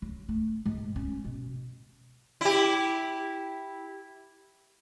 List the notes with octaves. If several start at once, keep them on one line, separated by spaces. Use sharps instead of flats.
F#3
A3
G#2
C#4
B2
E4 G4